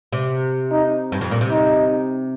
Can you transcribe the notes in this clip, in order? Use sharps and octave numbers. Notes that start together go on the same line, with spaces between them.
C3
D#4
G2
F2
A#2
C3
D#4